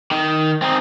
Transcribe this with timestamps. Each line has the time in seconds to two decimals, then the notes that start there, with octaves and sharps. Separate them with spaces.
0.11 D#3
0.62 C4 D#4